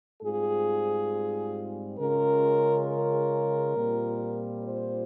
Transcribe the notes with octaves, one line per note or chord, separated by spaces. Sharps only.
G#2 G3 C4 F4 G#4
C#3 G#3 C#4 F4 A#4
A#4
A#2 G3 C4 F4
C5